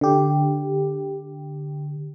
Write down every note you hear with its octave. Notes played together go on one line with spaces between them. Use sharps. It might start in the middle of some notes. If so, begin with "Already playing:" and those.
D3 G4